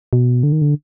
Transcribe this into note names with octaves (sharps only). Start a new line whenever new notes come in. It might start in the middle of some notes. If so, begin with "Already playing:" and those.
B2
D3
D#3
D3